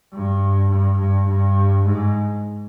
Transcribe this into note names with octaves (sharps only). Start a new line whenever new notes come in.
G2
G2
G2
G2
G#2